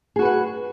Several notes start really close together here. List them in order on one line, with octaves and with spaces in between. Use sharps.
G#4 F#4 B4 F#5